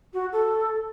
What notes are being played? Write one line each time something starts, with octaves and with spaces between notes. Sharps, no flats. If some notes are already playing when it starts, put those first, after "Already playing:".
F#4
A4